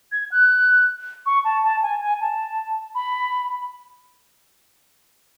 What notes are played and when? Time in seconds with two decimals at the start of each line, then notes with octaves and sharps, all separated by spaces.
0.12 G#6
0.32 F#6
1.26 C#6
1.44 A5
1.63 A5
1.82 G#5
2.01 G#5
2.20 A5
2.95 B5